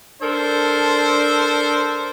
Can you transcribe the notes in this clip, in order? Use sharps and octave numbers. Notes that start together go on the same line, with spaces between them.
D4 A4 A#4 C5